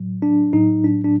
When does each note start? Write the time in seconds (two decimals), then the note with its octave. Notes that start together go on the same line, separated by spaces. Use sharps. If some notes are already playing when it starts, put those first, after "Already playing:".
Already playing: A2 F#3
0.22 D4
0.53 A2 F#3 D#4
0.84 D4
1.04 D4